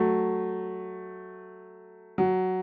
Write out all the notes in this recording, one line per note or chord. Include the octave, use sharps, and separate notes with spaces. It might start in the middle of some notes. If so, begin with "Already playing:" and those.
Already playing: F#3 A3
F#3